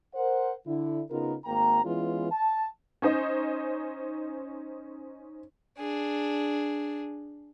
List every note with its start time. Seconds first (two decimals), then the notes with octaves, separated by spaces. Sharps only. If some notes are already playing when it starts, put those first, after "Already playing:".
0.15 A#4 C5 F#5
0.67 D3 E4
1.11 C#3 B3 D#4 F4 A#4
1.45 G#1 A#3 G5 A#5
1.84 E3 G#3 B3 C#4 E4 F4
2.32 A5
3.02 C#4 D#4 C5 D#5
5.79 D4 G#4